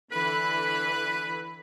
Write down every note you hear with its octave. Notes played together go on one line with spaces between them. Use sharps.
D3 E3 B4 B5